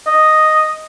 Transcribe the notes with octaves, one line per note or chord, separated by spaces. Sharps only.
D#5